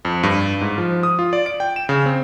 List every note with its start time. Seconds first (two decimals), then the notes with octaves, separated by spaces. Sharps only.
0.05 F2
0.23 G2
0.61 G#2
0.78 F3
1.03 D#6
1.19 F4
1.33 D5
1.46 D7
1.60 G5
1.76 E7
1.89 C#3
2.06 C4